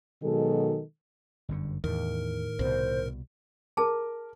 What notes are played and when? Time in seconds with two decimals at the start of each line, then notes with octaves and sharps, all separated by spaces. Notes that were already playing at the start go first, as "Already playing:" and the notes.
0.23 B2 D#3 F#3 G#3 A4
1.49 G1 F#2 D3
1.84 E2 A2 D#3 A#4
2.59 C2 B2 C5
3.77 G#4 A#4 A5